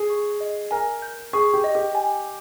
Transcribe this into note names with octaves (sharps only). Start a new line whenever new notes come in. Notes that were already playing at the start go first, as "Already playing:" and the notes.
Already playing: G#4
C#6
D#5
A#4 G#5
G6
G#4 C#6
G4
D#5
G4
G#5